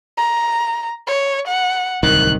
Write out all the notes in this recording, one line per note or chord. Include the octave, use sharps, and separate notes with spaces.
A#5
C#5
F#5
D1 C2 D#3 F#6